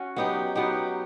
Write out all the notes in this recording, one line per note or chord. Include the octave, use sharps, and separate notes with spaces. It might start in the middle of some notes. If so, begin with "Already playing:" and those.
Already playing: C#4 F#4
F#3 B3 D#4 G4
F#3 B3 D#4 G4